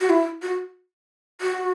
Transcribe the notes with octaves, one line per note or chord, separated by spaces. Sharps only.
F#4
E4
F#4
F#4